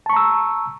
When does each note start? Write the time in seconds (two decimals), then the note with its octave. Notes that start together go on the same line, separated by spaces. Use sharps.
0.06 A5
0.10 C#6
0.13 A#5
0.16 E6